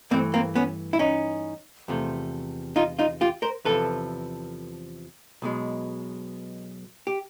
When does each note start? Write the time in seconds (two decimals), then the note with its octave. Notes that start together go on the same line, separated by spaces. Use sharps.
0.11 G2 E3 A3 A#3 C4
0.34 A#3 C4
0.56 B3 C#4
0.93 E4
0.99 C#4 D#4
1.88 E2 C3 F3 A3
2.76 D#4 F4
2.99 D#4 F4
3.21 F4 G4
3.42 A#4 C5
3.65 E2 C3 F3 A4 B4
5.42 B1 B2 G#3
7.07 G4